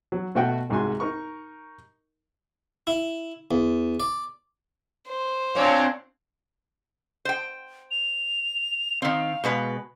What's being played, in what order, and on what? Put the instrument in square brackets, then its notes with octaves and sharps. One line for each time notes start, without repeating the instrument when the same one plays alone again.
[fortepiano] F#3
B2 A3 F#4 F#5 G5
C2 G#2 G#3 F#4 G#5 C6
D#4 A#4 C#6
[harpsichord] E4
E2
D5
[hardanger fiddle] C5
[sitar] A#2 C#5 [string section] C4 D4 F5
[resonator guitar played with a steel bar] C5 G5
[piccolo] F7
[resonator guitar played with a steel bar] D#3 C4 [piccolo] F5
[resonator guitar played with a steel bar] B2 G#3 B4